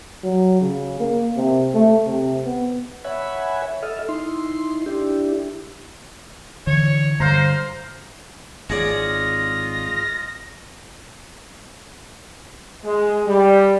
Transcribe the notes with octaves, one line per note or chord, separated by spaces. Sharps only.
F#3
C#3
A#3
C3
A3
C3
B3
C#5 E5 F#5 G#5 B5
A4 D#5 E5 F6
D#4 E4 C6
D4 E4 G4
D3 E3 C#5
G2 D3 C5 F5 A#5
G#1 C#4 F4 G#4 D5 D#5 F6 A#6
G#3
G3